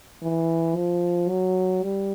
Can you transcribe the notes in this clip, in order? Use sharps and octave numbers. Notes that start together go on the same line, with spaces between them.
E3
F3
F#3
G3